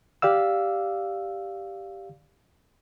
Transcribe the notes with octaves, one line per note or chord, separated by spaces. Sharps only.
G4 D5 F5 E6